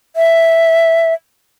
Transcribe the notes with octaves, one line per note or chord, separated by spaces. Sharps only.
E5